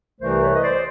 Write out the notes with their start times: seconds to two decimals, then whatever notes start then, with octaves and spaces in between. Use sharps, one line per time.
0.20 C2 C3 E3 A3 A#4 C5
0.41 B4 C#5
0.55 D#5
0.62 C5 D5